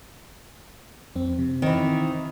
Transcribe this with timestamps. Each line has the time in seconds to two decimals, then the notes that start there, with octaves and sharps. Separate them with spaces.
1.16 F2 C4
1.39 C3
1.62 D#3 E3 C4